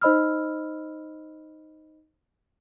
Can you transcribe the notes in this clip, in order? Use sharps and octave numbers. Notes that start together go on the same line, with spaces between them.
D#4 C5 D#5 B5 E6 F6